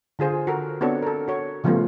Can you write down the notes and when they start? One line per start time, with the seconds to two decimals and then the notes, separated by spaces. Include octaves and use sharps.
0.19 D3 F4 G#4 C5
0.47 F#4 A4 A#4
0.81 B3 C4 D4 F#4 A4 C#5
1.03 A4 A#4
1.28 F#4 C#5
1.64 C#3 F3 G3 A3 B3 F4